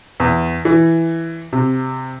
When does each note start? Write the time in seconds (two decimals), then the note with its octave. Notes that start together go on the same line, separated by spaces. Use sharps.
0.20 E2
0.65 E3
1.53 C3